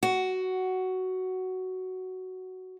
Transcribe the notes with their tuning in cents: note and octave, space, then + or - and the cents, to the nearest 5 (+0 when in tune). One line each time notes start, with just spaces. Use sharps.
F#4 +10